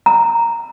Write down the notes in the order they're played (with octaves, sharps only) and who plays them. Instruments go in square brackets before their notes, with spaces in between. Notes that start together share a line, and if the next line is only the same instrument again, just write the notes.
[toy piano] A#5